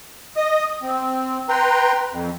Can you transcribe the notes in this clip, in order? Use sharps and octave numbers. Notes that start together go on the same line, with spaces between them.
D#5 D#6
C4
B4 G5 A#5 C6
F2